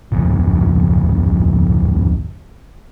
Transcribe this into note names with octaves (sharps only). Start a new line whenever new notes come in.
D1 G#1 F2